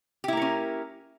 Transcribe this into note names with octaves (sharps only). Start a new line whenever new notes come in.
A#3 C#4 E4 G4 A#4